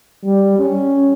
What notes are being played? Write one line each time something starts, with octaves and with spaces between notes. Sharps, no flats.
G3
C#4